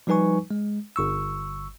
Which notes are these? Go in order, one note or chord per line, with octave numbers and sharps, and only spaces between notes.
F3 G3 D#4 B4 G#5 C#6
G#3
G1 C#6 E6